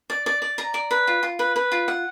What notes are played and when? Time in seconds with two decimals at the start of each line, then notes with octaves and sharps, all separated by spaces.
0.10 D5
0.26 D5
0.42 D5
0.58 A#5
0.74 D5
0.91 B4
1.07 F4
1.23 F4
1.39 B4
1.56 B4
1.72 F4
1.88 F#5